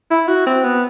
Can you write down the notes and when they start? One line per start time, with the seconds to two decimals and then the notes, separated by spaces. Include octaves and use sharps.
0.11 E4
0.28 F#4
0.46 C4
0.64 B3